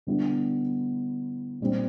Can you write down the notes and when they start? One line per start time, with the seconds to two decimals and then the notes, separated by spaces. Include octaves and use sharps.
0.07 D3 G3 B3 E4
1.60 A#2 G3 C4